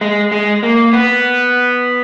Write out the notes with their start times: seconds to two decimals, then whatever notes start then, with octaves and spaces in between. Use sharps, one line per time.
0.01 G#3
0.32 G#3
0.63 A#3
0.93 B3